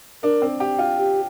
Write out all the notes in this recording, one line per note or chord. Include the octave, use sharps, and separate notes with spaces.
D4 A#4
C4
G4
F4
G4